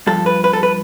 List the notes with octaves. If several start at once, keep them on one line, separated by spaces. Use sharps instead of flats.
G2 F3 A4
B4
B4
A4
B4